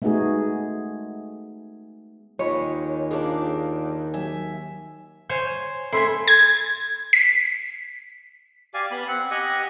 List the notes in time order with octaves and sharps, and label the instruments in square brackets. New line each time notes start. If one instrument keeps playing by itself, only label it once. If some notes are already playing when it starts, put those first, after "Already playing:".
[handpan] G#3 A3 B3 D#4 F#4 G#4
[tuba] D#2 [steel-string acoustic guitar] G#3 [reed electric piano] F4 B5 [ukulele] C#5
[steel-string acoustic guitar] C#3 A#3 D4 [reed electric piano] F4 G#4
[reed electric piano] F#3 G#5 [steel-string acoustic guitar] E5
[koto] C5 C#5 G#5
[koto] A3 E4 [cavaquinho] G#5 C6
[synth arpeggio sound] G#6
B6
[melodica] G4 D5 F5 G#5
B3 B5
C4 F#5
G4 D#5 F#5 G#5